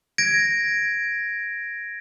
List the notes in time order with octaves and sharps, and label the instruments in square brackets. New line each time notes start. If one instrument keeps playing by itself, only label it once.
[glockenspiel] G#6 A#6 D7